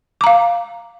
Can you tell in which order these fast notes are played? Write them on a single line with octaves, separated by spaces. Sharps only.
D6 A#5 F5